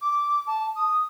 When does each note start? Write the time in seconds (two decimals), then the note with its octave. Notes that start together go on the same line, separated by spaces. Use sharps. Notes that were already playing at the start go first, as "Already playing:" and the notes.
0.02 D6
0.47 A5
0.76 D#6